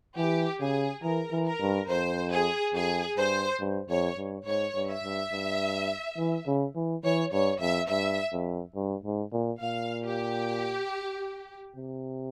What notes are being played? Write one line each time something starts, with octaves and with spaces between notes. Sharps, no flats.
E3 G4
C#3 G#4
E3 A#4
E3
A#4
G2
F2 C5
G#4
F2 G#4
G2 C5
G2
F2 C#5
G2
G#2 C#5
G2
E5
G2
G2
E3
C#3
E3
E3 C#5
G2 C#5
F2 E5
G2 E5
F2
G2
G#2
A#2
A#2 F5
G4
C3